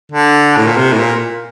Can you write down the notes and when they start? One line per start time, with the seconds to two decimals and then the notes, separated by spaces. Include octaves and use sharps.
0.12 D3
0.57 A2
0.67 A#2
0.77 C3
0.93 A2
0.99 A#2